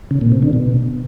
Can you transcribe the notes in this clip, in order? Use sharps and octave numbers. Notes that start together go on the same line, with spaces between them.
C#3
A#2
C3
D3
B2